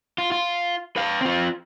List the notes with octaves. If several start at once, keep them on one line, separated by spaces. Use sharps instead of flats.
F4
F4
B4 F5
C4 F4